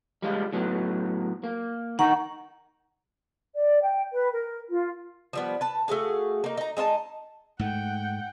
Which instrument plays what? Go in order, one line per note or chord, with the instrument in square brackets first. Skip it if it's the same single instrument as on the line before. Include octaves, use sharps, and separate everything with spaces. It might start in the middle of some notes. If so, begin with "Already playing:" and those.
[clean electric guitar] G3 G#3 F4
A2 F#3 B3
A#3
[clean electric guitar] D#3 D#4 A#4 [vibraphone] F#5 A#5 C#6
[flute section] D5
G5
B4
A#4
F4
[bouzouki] F3 G3 B3
B4 A5
A3 F#4 G#4 F5
A#3 D#4
D#4 A#5
G#3 D#4 E4 A5
[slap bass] G#2 A3 [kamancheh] F#5 G5